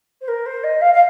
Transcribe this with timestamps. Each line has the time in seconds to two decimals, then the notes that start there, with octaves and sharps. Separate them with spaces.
0.21 C5
0.28 A#4
0.46 C5
0.63 D#5
0.81 F5
0.93 F5